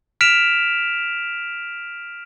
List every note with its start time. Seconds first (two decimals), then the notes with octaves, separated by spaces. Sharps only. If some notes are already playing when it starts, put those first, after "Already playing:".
0.21 F6 B6 D7 E7 F7